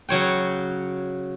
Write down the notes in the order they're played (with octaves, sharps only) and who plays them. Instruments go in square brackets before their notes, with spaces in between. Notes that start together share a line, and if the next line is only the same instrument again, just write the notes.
[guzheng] C#3 F#3 C#5 G5